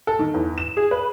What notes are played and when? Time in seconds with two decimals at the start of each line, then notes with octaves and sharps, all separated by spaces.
0.07 A4
0.19 D#3
0.34 E2
0.58 E7
0.77 G#4
0.91 B4